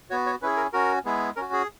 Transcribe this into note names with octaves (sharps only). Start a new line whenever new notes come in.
B3 F#4 C#5
C#5
C#4 E4 G#4 B4
A#4
C#4 F#4 A#4
G#3 B3 E4 G#4
C#4 F#4 A#4
G#4